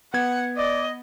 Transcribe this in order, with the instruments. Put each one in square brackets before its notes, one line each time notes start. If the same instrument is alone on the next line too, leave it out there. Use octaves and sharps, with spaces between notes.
[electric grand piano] B3 G#6 [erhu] F#5
[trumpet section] D5 [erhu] D#5